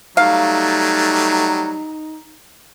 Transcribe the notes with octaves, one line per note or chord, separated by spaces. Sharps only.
F#3 G3 A3 D#4 F5